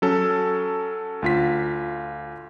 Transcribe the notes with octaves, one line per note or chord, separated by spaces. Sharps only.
F#3 C#4 A4
D2 F4 B6